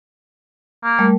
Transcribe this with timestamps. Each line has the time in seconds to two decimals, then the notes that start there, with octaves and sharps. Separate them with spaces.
0.83 A#3
0.99 G3 A3 A#4